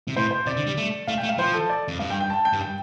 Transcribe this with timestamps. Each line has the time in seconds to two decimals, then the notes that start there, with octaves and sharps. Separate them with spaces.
0.08 C3
0.16 A2 C5
0.31 C5
0.46 C3 D5
0.57 D3
0.67 G3
0.77 A3
1.07 A3 F5
1.18 G5
1.23 A3
1.29 F5
1.38 F3 C5
1.54 A4
1.70 D5
1.88 F2
1.99 G2 F5
2.10 G5
2.20 G5
2.30 A5
2.45 G5
2.53 G2
2.61 G5